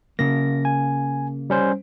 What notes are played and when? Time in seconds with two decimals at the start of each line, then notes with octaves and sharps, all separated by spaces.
0.19 C#3 A#3 A#6
0.65 G#5
1.50 G3 C#4 C5